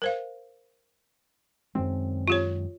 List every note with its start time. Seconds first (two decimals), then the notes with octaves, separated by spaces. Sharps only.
0.02 A#4 C5 F5
1.75 F#2 D#3 G#3 C4
2.28 F4 G4 C#5